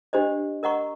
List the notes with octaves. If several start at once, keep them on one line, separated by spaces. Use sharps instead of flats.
D4 G4 C5 D#5
A#4 D#5 F#5 A#5 C#6